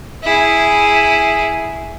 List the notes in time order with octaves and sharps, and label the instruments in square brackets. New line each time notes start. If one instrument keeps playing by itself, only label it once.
[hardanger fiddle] E4 G#4